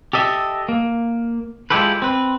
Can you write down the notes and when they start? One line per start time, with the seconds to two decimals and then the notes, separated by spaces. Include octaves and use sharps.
0.13 G4 A4 D#5 E5
0.69 A#3
1.70 G#3 E4 F4 G4 A4 B4
2.02 C4 B4